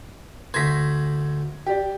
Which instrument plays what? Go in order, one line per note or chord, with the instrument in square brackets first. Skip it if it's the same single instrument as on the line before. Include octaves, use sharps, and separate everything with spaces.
[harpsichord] D2 C5 [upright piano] G#6 A#6 B6
[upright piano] G4 D5